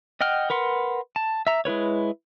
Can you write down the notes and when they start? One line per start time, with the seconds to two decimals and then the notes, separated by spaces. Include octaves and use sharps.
0.21 D#5 F#5 G5 F6
0.50 A#4 B4 F#5 C6
1.16 A5
1.47 E5 A#5
1.65 G#3 E4 B4 C#5